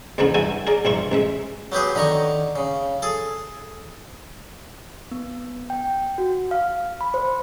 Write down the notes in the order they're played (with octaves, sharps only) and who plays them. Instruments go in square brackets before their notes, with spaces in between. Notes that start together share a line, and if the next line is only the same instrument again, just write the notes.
[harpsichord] D2 C#3 E3 F#3 A3 B3
G2 E4 F#4 A4 G#5
G#4 A#4 D5
A#1 G2 E4 F4 C#6
A1 G#3 E5
F#3 B3 G4 G#4
D3 D#3 A#5 C#6
C#3
G#4 A4
[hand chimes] B3
G5
F#4
F5
B5
C5